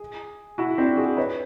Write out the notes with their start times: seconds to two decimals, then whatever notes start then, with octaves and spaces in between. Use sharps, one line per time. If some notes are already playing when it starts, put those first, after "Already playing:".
Already playing: G#4
0.58 E4 F#4
0.78 C4 D4
0.97 F#4 G#4
1.17 B4 C#5